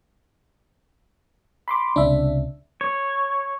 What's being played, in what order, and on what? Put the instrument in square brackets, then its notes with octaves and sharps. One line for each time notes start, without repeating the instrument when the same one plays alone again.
[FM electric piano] B5 C6 D6
[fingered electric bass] C#2 C3 [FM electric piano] D4 E5
[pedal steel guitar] C#5